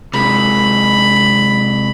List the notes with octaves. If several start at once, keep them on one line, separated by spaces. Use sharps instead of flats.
C3 G#3 B5